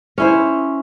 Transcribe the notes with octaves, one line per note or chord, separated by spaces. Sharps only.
C#4 E4 C5